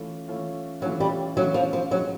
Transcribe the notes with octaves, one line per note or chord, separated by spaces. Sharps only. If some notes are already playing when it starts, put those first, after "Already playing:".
Already playing: E3 A3 C#4 F4
E3 A3 C#4 F4
E3 F#3 A3 C#4 F4
G3
E3 F#3 A3 C#4 F4
F3
F3
G#2 F3 F#3 G#3